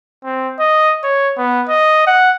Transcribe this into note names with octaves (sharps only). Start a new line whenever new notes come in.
C4
D#5
C#5
B3
D#5
F#5